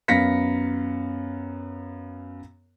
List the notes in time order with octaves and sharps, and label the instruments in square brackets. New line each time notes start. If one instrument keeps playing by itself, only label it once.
[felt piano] F#2 B3 F5 A#6 B6 C#7